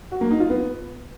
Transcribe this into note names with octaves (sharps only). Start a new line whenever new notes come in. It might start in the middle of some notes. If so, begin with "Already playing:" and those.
F#4
A#3
D#4
F4
B3